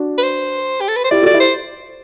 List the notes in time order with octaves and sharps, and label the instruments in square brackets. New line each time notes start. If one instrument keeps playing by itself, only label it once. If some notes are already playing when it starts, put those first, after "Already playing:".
Already playing: [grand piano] D4 F#4
[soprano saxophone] B4
C5
G4
A4
B4
C5
[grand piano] E4 G4 [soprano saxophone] D5
[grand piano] F#4 A4
[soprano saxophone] D5
[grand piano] E4 G4
[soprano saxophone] C5